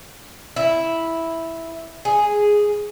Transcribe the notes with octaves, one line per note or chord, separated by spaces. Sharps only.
E4
G#4